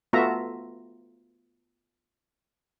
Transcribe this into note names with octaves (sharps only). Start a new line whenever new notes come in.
A3 B3 F4 F#4 E5 A#5